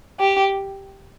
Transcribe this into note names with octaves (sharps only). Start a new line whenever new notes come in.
G4